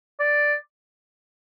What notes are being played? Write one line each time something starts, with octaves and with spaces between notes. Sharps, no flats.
D5